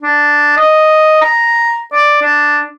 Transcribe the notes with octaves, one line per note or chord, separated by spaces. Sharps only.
D4
D#5
A#5
D5
D4